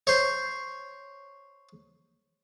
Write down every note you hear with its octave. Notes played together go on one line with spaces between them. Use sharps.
C5 C#5